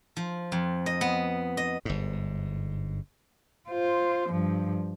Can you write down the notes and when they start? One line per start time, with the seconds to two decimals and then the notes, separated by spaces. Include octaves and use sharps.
0.17 F3
0.52 F2
0.86 D#5
1.01 B3
1.57 D#5
1.85 G1 G#2
3.69 F4 C5
4.30 G2 F3